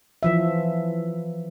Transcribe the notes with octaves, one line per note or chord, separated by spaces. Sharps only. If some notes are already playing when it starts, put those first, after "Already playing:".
E3 F3 E5